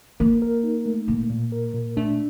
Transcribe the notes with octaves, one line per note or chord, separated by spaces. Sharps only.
A#3 A#4
A#4
D#4
A3
A#2 A#3
A#2
A#4
A#2
A3 D4